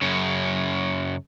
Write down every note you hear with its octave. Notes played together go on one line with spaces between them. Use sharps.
F#2 C#3